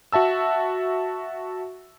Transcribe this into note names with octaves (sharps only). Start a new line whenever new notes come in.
F#4 E5 A5 E6